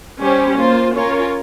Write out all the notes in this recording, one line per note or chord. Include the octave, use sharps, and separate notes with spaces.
G3 C#4 G4 C5
A#3 F4 C5
C#4 F4 A#4 C#5